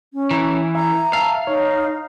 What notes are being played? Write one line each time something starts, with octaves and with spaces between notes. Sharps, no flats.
C#4
E3 E4 A#5
E5 A#5
E5 F5 A5
D#4 C#5